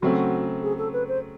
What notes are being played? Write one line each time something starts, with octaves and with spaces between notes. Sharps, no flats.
C#3 F#3 A3 C4 F#4
G#4
A4
B4
C5